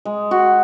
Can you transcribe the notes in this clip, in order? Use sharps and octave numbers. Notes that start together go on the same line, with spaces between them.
G#3
F#4